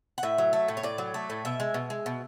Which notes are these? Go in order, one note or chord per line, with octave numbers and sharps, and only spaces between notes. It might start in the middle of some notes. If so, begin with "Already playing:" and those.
F#5
A2 E5
F#3
A3
A2
C#5
A2 D5
F#3
A3
A2
B2 E5
G#3
B2
G#3
B2